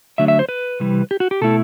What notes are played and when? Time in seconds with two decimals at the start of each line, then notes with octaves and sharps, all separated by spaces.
0.18 D3 F#3 A3 D4 E5
0.28 E5
0.39 C5
0.49 B4
0.80 C3 E3 G3
1.11 G4
1.20 F#4
1.31 G4
1.41 B2 A3 E4 A4